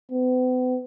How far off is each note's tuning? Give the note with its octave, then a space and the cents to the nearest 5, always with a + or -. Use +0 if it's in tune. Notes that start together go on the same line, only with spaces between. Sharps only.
B3 +45